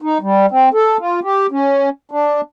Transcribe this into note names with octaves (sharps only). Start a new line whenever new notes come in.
D#4
G3
C4
A4
F4
G4
C#4
D4